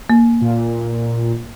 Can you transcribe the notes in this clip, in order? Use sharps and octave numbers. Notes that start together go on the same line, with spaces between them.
A#3
A#2